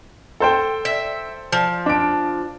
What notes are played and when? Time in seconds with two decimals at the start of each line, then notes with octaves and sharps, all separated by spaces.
0.40 A4 C5 G5
0.85 E5
1.52 F3
1.86 D4 D7